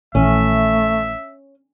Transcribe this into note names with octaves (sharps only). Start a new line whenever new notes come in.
A#1 E3 A3 C#4 E5